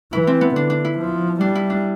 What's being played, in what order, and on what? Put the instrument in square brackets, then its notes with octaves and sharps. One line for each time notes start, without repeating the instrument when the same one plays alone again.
[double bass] E3 [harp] E4
[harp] C4
B3
[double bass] D3 [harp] D4
[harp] D4
E4
[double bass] F3
[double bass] G3 [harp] D4
[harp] E4
D4